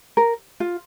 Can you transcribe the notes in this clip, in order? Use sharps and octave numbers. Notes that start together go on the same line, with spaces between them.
A#4
F4